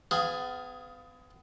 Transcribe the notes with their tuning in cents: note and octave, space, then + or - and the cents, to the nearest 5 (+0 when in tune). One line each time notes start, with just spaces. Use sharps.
B3 +35 G#4 +0 F5 +0